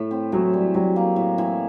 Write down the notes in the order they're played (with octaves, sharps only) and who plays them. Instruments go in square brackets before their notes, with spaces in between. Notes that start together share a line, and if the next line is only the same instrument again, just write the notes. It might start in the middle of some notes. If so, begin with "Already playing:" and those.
Already playing: [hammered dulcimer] A2 A3
C4
[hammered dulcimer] E3 [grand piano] F#3
[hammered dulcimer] G3
[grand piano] F#3 [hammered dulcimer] G3
[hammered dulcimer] A#3
A2
E3